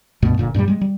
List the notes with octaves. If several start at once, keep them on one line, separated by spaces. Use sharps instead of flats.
C#2 G2 B2 A3
F1 A#2 D3
G2 A#2 F#3 G3
G3 G#3
G3